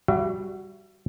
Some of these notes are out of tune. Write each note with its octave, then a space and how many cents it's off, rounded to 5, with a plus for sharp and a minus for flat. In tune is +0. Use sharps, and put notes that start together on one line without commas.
G3 +0 F#4 +10 E5 +40